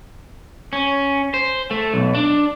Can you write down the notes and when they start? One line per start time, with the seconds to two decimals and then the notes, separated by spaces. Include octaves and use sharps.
0.73 C#4
1.34 C5
1.71 A3
1.94 B1
2.15 D4